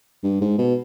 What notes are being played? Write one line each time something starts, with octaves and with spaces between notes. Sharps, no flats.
G2
G#2
B2